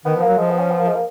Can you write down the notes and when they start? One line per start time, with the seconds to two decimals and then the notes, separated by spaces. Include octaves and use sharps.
0.05 D#3 B3
0.16 F3
0.22 A#3
0.27 F#3
0.38 F3 G#3
0.50 B3
0.60 C#4
0.71 B3
0.79 A#3
0.87 G#3
0.95 A#3